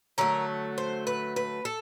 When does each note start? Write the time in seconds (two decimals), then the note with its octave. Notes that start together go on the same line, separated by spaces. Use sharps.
0.18 D3 F#3 A3 A#4
0.78 C5
1.07 B4
1.36 B4
1.65 A4